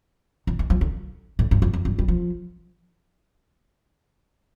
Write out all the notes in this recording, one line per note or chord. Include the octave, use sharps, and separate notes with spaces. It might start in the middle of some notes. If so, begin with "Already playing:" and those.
D#3
D#3
F3
D3
A2
G2
F2
F2
G2
G3
F3